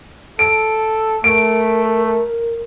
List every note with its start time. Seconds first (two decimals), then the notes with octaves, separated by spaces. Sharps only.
0.39 A4 D7
1.24 A3 A#4 D7